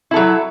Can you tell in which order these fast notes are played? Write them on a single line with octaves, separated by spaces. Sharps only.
E4 A4 F#3